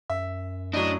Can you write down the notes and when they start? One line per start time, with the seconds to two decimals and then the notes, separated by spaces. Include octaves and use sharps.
0.10 F#2 E5
0.73 A2 F#3 D4 D#5